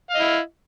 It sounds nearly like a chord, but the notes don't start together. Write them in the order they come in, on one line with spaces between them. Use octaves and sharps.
F5 D#5 E4